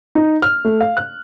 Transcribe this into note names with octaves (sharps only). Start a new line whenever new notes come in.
D#4
F6
A3
F5
F#6